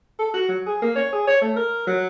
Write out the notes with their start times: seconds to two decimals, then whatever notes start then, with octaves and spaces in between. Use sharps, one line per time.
0.19 A4
0.34 F#4
0.48 F#3
0.66 G#4
0.82 A#3
0.96 C#5
1.12 G#4
1.27 C#5
1.41 A3
1.56 A#4
1.87 F#3